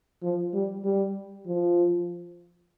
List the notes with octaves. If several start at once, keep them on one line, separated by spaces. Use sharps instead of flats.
F3
G3
G3
F3